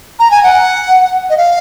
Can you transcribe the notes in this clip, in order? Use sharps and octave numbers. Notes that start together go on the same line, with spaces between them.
A#5
G#5
F#5
D#5
F5